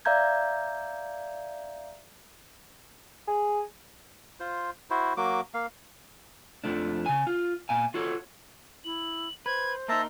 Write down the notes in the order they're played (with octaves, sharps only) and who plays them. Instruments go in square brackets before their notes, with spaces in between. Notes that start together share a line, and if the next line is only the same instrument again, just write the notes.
[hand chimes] D5 E5 F5 A#5 G6 G#6
[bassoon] G#4
[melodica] F4 C5
E4 F#4 C5
F#3 A#3 F#4 D6
A#3 F5
[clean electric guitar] F2 F3 A3 D4
C#3 G#5
F4
A#2 F5 G#5
F4 F#4 A4 C#5
[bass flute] E4 [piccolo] F#7
[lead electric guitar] B4 [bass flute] C5 [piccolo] G#6
[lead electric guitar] A#3 D#4 [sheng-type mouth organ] E5 A5 A#5 [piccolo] C6